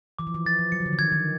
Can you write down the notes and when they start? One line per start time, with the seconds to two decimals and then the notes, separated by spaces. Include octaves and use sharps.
0.19 E3 D6
0.27 F3
0.34 E3
0.46 F3 A6
0.59 F3
0.72 F#3 C#7
0.80 D#3
0.86 D3
0.93 E3
0.99 D#3 G#6
1.12 D#3